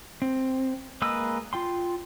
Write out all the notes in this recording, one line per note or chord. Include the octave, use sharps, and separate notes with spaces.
C4
G#3 A#3 B4 D#5 E6
F4 G5 C6